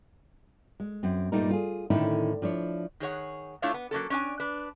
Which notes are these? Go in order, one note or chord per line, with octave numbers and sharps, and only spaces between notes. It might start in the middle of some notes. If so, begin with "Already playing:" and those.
G#3
F#2 C4
G2 A#2 G3 A3 D#4 A#4
F4 G#4
A2 D3 D#3 C#4 D#4 E4
F3 D4 E4 C#5
D#3 G#4 C#5 F#5
A3 D4 E4 F4 C#5 F5
B3
F#3 A#3 C#4 A4
C#4 D4 G#5
D4 B4